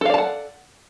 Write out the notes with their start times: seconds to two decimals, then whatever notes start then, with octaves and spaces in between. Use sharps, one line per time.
0.01 A4
0.05 F5
0.10 D5
0.14 A5
0.18 F#5